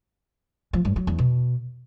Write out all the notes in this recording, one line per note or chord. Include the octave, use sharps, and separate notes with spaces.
F3
G2
F#3
E2
B2